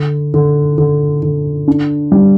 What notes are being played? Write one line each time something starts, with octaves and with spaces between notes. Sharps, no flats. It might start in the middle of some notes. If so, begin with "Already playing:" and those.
Already playing: D3
D3
D3
D3
D4
G3